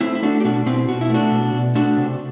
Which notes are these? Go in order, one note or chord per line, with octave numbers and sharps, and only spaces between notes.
A3 C4 E4
E4
A3 D4 F#4
G4
B2 D4 F#4
B2 C4 E4
B2 F#4
E4
A3 D4 F#4
B2
B2
A3 D4 F#4
C3